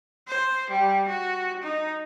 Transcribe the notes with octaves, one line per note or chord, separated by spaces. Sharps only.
C5
G3
F#4
D#4